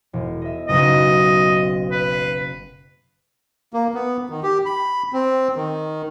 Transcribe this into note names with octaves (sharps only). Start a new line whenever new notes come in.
E1
D#5 E5
F#1 B1 F#4 D#5
B4
B6 C7
A#3
B3
D#3
G4
B5
C4
D#3